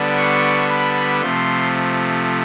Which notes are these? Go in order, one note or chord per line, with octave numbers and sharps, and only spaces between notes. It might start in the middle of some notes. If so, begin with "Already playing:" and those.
Already playing: D3 G3 B3 D4
C#6
B5
C3 F3 A3 C6